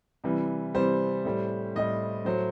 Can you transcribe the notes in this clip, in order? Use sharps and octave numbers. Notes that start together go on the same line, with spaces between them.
C3 E3 G3
C3 E3 G3 C5
A2 G3
A2 G3 D#5
A2 F#3 C5